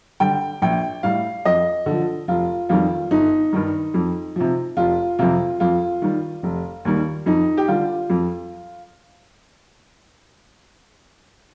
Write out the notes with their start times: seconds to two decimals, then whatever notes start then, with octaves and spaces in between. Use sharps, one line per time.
0.20 D3 G3 G5
0.62 A#1 G5
1.03 A2 G3 F5
1.45 F2 D#5
1.86 D3
1.91 F3
2.28 F1 F4
2.69 F2 D#3 G3 F4
3.11 G1 D#4
3.53 G2 D#3 G3
3.94 F2
4.36 C3 F3
4.77 F1 F4
5.19 F2 C3 F4
5.60 F2 F4
6.02 D#3 G3
6.43 F1
6.85 D#2 D#3 G3
7.26 F2 D#4
7.57 G4
7.68 D3 G3 F4
8.10 F2